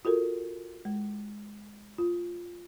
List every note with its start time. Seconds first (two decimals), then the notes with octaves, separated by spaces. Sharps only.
0.05 F4 F#4 A4 A#4
0.85 G#3
1.98 F4